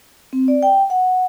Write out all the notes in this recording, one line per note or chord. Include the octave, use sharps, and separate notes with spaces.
C4
D5
G5
F#5